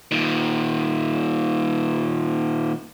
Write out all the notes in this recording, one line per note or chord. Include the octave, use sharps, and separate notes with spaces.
A#2 D#3